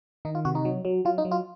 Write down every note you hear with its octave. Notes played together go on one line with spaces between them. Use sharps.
D#3 D#4
F4
C3 F#4
D#4
F#3
F#3
F#3 F4
D#4
F#3
F4